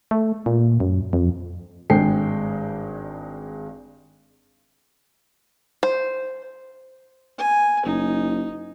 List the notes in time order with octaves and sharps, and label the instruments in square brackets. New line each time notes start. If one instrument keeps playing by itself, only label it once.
[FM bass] A3
A#2
F#2
F2
[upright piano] G#1 G2 G#3 G#4 G5 C7
[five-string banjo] C5
[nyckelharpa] G#5
[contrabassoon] F#1 [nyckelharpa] D#4